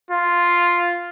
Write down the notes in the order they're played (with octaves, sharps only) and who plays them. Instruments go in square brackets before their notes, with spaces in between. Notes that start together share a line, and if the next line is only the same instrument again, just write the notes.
[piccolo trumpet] F4